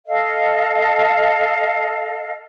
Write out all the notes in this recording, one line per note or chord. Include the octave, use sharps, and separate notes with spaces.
A4 D#5 F5